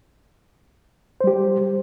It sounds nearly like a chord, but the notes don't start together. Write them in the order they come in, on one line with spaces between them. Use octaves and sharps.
C5 G3 G4